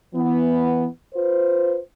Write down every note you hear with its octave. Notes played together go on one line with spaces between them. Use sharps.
E3 B3
F4 B4 C5